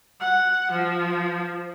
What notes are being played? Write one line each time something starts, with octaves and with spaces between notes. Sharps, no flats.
F#5
F3